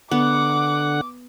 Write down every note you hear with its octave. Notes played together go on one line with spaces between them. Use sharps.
D3 B3 F#5 D6